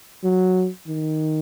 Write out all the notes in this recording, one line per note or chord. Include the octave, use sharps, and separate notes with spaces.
F#3
D#3